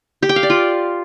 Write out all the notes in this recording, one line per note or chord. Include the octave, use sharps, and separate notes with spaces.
G4
G5
F5
D5
F4